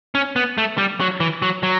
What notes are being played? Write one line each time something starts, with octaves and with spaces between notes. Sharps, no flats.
C#4
B3
A3
G3
F#3
E3
F#3
F#3